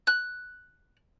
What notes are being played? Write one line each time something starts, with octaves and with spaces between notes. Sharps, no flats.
F#6